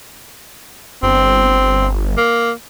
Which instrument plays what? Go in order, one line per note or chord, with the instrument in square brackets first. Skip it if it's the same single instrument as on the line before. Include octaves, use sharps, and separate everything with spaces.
[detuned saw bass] G1 [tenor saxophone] C4
[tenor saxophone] A#3